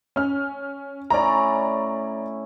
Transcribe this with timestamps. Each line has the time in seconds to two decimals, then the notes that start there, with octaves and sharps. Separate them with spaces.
0.16 C#4 F6
1.10 A2 C#4 E4 D5 A#5